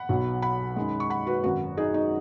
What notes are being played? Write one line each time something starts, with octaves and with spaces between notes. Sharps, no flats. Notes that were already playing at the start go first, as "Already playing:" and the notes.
Already playing: F#5 B5
B1 B2 F#3
F#5 B5
F#2 D#3 G#3
C#6
F#5 B5
F#4 B4
G#1 F#2 F#3 F#4
D#4 G#4
D#4